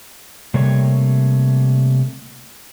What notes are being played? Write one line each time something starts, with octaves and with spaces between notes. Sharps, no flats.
C3 G3 A3 A#3 C#5